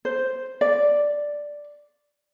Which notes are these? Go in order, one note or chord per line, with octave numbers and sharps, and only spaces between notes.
C5
D5